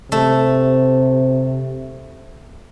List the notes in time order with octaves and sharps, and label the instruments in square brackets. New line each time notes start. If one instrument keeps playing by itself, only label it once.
[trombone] C3 [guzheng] A3